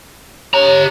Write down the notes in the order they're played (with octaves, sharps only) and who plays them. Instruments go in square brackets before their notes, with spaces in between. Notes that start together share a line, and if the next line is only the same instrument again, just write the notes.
[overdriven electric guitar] G4 A#5 [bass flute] C#5